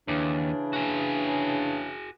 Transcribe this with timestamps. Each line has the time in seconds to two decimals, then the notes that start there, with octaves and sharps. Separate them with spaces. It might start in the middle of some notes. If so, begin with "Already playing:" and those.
0.08 D#2 C#3 E3 D4
0.73 F#4 G#4